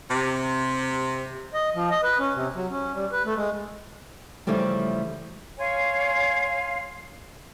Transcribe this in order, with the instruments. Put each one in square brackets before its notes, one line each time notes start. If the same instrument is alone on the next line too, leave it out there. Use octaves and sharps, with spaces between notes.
[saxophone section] C3
[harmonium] D#5
F3
D#5
B4
C#4
C3
F#3
C#4
G3
B4
A3
G#3
[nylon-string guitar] C#3 E3 F3 G3 A3
[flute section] C#5 F5 G#5 C6